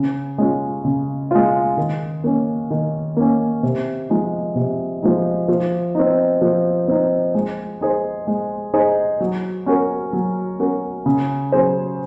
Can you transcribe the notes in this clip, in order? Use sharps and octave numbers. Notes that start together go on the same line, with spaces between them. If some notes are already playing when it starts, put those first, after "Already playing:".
Already playing: C#3
G#3 C#4 F4
C#3
G#3 C#4 F4
D#3
A#3 C#4
D#3
A#3 C#4
C3
F3 G#3 D#4
C3
F3 G#3 D#4
F3
C4 D#4
F3
C4 D#4
G#3
D#4 G#4 C5
G#3
D#4 G#4 C5
F#3
C#4 F#4 A#4
F#3
C#4 F#4 A#4
C#3
F#3 C#4 G#4 C5